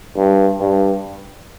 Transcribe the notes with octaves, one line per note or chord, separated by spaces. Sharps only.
G2
G2